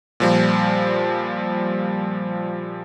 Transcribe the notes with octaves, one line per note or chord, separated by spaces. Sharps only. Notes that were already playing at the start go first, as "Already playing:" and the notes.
A#2 F3 G3